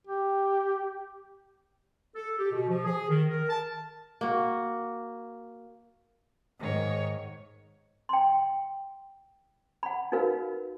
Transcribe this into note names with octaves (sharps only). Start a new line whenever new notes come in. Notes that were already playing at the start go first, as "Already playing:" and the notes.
G4
A4
G4
B2
F3
G#4
D#3
A#4
A5
A#3 F#4
G#2 D#3 C#5
G5 C6
F#5 B5
D#4 F#4 A#4 B4 F5